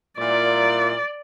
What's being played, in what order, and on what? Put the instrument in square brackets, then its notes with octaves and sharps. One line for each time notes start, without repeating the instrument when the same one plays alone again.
[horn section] A#2 E4 [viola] D5